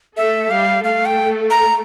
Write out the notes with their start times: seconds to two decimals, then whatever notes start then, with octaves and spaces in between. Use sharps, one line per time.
0.17 A3 A4 E5
0.51 G3 G4 F5
0.84 A3 A4 F5
1.06 G5
1.50 A#5